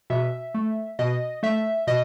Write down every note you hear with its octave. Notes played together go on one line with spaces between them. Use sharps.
B2 E5
A3
B2 D#5
A3 E5
B2 D#5